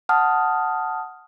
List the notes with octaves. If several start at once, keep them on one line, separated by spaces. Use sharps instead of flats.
F#5 A5 D#6 F6